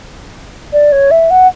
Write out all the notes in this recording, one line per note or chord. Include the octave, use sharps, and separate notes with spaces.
D5
C#5
E5
F#5